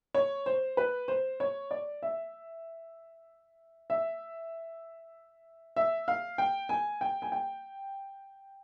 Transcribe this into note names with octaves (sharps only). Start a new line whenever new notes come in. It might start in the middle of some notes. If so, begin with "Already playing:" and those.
C#5
C5
B4
C5
C#5
D5
E5
E5
E5
F5
G5
G#5
G5
G#5
G5